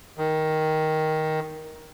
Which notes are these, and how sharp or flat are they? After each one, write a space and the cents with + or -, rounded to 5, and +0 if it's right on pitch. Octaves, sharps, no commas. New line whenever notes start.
D#3 +10